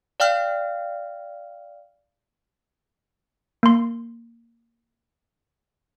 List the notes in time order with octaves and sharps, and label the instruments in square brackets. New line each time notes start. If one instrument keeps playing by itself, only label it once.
[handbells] D5 F5 G5 F6
A#3 C6